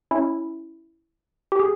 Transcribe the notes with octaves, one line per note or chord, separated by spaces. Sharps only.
C#4 E4
G4
G#4